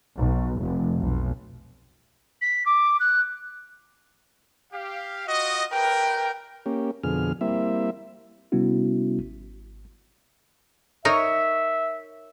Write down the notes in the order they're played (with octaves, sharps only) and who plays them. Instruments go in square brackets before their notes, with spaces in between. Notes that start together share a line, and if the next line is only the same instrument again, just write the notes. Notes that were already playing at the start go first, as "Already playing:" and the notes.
[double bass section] B1
F1
B1
[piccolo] B6
D6
F#6
[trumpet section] G4 F5
F4 F#4 D#5
[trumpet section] A#4 B4 [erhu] G5
[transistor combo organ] A#3 C#4 G4
F2 B2 D3 G#4 F6
G3 A#3 C4 E4 E5
[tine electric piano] C3 G3 B3 C#4 E4 F#4
G#1
[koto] D#4 A#4 [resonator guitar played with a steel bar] C#5 [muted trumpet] E5